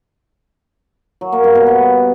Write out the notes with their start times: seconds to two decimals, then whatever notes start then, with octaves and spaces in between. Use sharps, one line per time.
1.21 F#3
1.32 A#3
1.44 G2
1.55 B2
1.67 B3